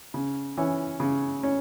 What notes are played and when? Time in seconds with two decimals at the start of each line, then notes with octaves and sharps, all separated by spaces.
0.14 C#3
0.57 E3 C#4
1.00 C#3
1.43 C#4